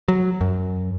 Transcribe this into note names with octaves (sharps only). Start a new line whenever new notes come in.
F#3
F#2